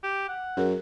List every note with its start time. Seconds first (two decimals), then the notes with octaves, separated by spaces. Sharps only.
0.03 G4
0.29 F#5
0.57 F#2 G#4 A#4